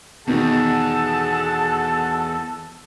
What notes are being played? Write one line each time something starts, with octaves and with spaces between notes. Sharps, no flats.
E2 B2 D#3 G#4 A4 F#5 A5